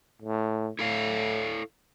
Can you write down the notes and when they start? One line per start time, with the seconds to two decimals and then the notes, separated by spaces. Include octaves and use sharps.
0.22 A2
0.79 A2 E4 A4 F5